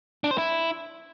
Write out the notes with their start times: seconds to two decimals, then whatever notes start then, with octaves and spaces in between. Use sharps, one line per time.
0.24 D4
0.31 C5
0.38 E4